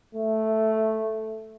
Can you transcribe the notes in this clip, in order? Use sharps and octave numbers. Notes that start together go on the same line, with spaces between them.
A3